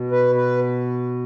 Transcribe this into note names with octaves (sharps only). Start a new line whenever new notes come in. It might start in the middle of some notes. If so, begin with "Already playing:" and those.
Already playing: B2
B4
B4